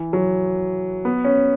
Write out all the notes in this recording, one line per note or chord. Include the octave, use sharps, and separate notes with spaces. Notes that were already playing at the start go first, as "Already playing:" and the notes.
Already playing: E3
F#3
B3
C#4